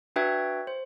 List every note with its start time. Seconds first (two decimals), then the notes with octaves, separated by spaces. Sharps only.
0.16 D4 F#4 B4 E5 G5 G#6
0.67 C5